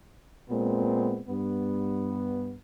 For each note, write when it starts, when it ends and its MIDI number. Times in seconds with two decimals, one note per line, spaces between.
0.49 1.20 46
0.49 1.20 56
0.49 1.20 59
0.49 1.20 60
1.28 2.54 43
1.28 2.54 59